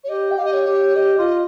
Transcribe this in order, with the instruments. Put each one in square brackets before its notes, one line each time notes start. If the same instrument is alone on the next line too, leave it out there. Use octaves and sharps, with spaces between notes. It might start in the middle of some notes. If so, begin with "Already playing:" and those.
[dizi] C#5
[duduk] G4 [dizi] D#5
[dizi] G5
[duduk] G4 [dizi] F5
[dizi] D#5
C#5
[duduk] G4
[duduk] G4 [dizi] D#5
[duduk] F4 [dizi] D#5